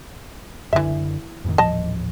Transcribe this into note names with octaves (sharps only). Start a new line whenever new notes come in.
F#1 D3 E3 E5
F2 A2 D#3
D#1 A1 F3 D#5 A5